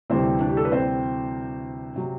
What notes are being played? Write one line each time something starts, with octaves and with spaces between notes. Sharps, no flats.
D2 C3 E3 G3 C4 C5
D4 D5
G4
A4
B4
C4 C5
C3 F#3